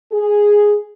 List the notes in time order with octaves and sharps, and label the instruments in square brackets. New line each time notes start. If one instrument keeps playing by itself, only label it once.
[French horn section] G#4